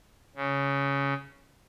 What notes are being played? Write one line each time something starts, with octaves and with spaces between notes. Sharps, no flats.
C#3